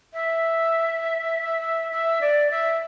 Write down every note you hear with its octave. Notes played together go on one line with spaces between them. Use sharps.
E5
E5
D5
E5